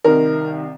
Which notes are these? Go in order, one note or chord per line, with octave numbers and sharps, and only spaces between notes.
C2 C3 D#3 A#4